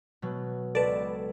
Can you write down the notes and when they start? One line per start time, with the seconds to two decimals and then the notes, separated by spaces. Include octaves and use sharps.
0.22 B2 F#3
0.75 C#2 A4 B4 D5 A5